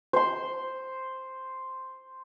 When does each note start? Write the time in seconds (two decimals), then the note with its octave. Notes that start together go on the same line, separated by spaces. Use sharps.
0.13 C5 C6